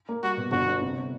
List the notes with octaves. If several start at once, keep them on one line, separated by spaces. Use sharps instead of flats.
A#3
G3 F#4
B2
G1 F#4
D3
C3